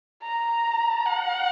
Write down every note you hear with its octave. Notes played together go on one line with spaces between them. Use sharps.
A#5
F#5